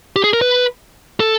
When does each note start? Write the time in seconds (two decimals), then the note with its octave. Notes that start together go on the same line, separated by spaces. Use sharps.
0.16 G4
0.24 G#4
0.33 A#4
0.42 B4
1.20 A4